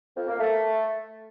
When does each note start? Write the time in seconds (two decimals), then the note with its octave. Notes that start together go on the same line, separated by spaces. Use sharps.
0.17 F2
0.28 A#3
0.40 A3